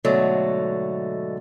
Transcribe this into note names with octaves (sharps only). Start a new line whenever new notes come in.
G#2 B2 D3 F#3 A3